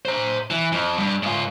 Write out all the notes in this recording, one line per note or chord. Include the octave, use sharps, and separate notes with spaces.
C5 A#5
E3
F2
G2
G#2 F4